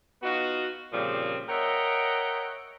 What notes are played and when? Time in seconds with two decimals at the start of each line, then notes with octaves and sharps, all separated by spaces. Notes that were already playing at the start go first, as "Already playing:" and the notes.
0.23 B3 D#4 F4 F#4
0.93 A#2 C#3 F3 G3 A#3 C4
1.49 A#4 C#5 D#5 E5 F#5 G5